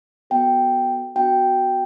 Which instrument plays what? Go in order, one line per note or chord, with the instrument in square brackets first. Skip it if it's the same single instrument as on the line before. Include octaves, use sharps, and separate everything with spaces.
[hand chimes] B3 F#4 A4 G5
B3 D4 F#4 G5